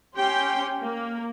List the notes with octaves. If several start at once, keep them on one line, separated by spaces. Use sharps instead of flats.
C#4 G4 G5 C6
A#3